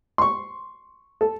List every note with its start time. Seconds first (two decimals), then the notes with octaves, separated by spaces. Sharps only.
0.18 C6 C#6
1.21 A4